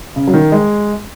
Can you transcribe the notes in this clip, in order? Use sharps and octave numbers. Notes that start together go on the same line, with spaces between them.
C#3
F#3
D#3
G#3